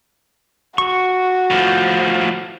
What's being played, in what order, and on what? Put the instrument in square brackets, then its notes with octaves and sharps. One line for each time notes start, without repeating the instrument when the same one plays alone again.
[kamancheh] F#4 [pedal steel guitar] C#6
[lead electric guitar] A2 F3